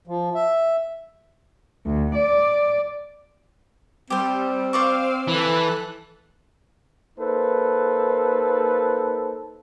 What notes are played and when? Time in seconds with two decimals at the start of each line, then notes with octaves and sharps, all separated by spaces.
0.07 F3
0.35 E5
1.86 D2
2.15 D5
4.10 G3 C4 G4 C5
4.73 C5 D5 F5 C#6
5.28 E3 A4 F#6
7.18 A#3 D#4 A4 B4 C5